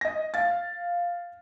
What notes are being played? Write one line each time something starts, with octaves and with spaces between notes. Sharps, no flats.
D#5 A#6
F5 A6